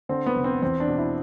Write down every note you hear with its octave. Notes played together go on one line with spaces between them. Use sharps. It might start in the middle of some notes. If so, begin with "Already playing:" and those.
D3 C4
B3
F1
C4
E2 C4
D4
B2
E4